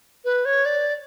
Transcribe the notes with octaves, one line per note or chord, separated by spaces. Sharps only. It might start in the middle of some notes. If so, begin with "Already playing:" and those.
B4
C#5
D5